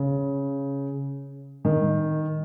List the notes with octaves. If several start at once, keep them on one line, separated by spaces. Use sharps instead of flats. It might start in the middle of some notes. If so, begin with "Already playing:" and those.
Already playing: C#3
D#3